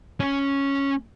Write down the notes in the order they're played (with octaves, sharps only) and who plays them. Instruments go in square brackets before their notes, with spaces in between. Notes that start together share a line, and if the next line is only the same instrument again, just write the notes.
[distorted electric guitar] C#4